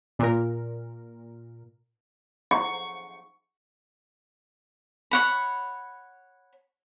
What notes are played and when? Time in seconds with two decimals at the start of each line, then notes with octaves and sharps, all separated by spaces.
0.19 A#2 A#4
2.51 C#6
5.11 C#5 F#5 B5